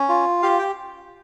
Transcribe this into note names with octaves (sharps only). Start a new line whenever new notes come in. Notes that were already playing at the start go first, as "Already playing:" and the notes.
Already playing: C#4
F4
G4 F5
G5